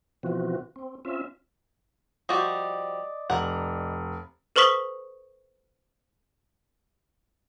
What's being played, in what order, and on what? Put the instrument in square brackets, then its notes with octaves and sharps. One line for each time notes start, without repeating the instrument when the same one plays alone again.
[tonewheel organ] B2 E3 F3 C4 F#4
C4
C4 C#4 F4 E5
[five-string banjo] F3 G3 F#4 [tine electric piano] D5 D#5
[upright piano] F1 [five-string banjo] A#4 F#5
[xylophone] A4 B4 C5 C#6 D#6 B6